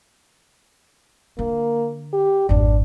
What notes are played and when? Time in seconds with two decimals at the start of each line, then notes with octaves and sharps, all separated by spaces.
1.39 D3 A#3
2.13 G4
2.49 G#1 F2 D4